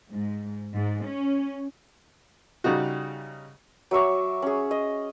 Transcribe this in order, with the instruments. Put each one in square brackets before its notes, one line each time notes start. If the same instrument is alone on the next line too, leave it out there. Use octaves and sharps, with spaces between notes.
[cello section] G#2
G#2
C#4
[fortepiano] C#3 G3 D#4 F#4
[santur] F#3 E5 C#6 D6
C#4 G#4
D#5